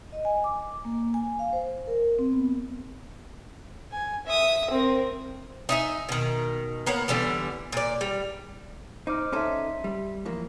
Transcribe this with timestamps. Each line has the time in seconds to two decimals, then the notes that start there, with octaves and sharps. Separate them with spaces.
0.12 D#5
0.25 G#5
0.44 D6
0.85 A#3
1.14 G#5
1.39 F5
1.53 C5
1.87 A#4
2.19 C4
2.33 B3
3.92 G#5
4.26 E5 D#6
4.70 C4 A#4
5.69 D#4 E5 G#5
6.09 B2 D#3
6.86 A#3 B3 C#5 F#5
7.08 D3 E3 G3 B3
7.72 A#2 D5
8.01 G3
9.07 D#4 C5 D6 F6
9.32 C#4 D#4 A4 E5 C6
9.84 G3
10.25 E3 F3 A#3